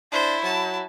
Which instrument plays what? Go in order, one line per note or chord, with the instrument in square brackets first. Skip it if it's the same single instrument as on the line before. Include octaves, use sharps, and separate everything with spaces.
[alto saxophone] D4 [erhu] E4 [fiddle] C5
[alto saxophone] F#3 [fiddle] A5